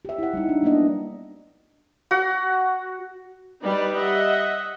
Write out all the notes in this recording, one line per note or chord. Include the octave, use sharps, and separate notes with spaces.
G4 E5
E4 F#5
G3 D#4
D4
F#3 A#3 B3 D4 D#5
F#4 F#5
G3 D#4 B4 D5
D#5 E5 F#5